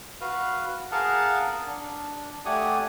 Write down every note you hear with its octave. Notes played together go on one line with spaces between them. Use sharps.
F#4 B4 F5
G#4 A#4 F5 F#5 A5
D4
A3 G4 D5 F#5 G#5 D#6